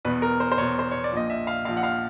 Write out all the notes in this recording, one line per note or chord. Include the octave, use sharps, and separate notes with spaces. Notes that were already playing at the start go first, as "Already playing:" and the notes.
E2 B2 B4
A#4
C5
C5
E2 B2 C#5
C5
C#5
D5
A#1 A#2 F3 D#5
E5
F5
A#1 A#2 F3 F5
F#5
F5